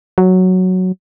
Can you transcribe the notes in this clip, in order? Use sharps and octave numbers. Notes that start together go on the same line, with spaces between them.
F#3